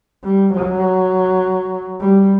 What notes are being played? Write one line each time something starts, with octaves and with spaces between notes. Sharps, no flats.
G3
F#3
G3